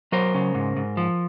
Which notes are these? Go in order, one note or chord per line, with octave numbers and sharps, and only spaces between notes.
F#3 A#4 C5
C#3
G#2
G#2
F3